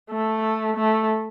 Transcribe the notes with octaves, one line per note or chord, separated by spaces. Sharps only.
A3
A3